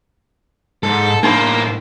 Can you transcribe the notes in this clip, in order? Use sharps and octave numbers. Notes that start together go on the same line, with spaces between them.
G#2 A4
A2 A#3 D4 D#4 C5 B5